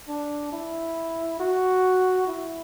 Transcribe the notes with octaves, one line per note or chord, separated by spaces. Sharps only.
D4
E4
F#4
E4